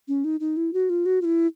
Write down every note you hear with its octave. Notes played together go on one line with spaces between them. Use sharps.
C#4
D#4
D#4
E4
F#4
F4
F#4
F4
E4